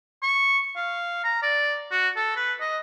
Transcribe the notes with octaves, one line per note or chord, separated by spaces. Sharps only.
C#6
F5
A#5
D5
F#4
A4
B4
D#5